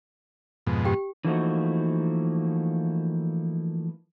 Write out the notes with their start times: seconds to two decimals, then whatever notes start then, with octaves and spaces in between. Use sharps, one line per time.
0.67 F2 G#2 B2
0.85 G4 G5
1.25 E3 F3 A3 A#3 D#4 F#4